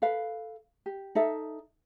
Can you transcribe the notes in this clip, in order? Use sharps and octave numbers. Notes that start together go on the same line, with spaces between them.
A4 B4 F5
G4
D#4 A4 E5